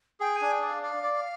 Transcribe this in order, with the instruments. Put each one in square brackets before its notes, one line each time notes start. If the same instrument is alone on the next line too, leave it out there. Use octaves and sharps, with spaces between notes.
[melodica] G#4 [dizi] G5
[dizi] G#5
[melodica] D4
[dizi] G5
[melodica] D5
[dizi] F5
[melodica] D5 [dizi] F5
[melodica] D5
[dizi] F5